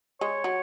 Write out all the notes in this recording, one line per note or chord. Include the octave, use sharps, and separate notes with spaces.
G#3 C#5
F#3